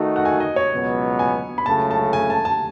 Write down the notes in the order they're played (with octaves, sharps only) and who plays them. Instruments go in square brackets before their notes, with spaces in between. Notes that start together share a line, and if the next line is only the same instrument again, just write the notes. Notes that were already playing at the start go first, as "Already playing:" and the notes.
Already playing: [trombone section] D#3 A3 D#4 F#4
[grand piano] F#5
G#5
D#5
C#5
[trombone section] C#2 B2 F#3 B3
[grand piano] G#5
B5
[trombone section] C#2 C#3 F#3 A3 [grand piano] A5
[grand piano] A5
G#5
A5
A5